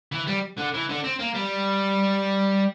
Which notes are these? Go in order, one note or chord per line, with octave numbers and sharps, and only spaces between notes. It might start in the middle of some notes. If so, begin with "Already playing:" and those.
E3
G3
D3
E3
D3
C4
A#3
G3